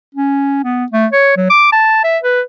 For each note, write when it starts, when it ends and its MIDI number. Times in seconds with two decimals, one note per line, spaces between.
0.15 0.62 61
0.64 0.85 59
0.92 1.07 57
1.13 1.36 73
1.37 1.45 54
1.50 1.69 86
1.73 2.03 81
2.04 2.18 76
2.23 2.41 71